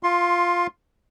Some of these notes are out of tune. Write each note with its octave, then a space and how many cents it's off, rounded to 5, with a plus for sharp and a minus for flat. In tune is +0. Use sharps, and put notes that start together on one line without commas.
F4 +0 C6 +20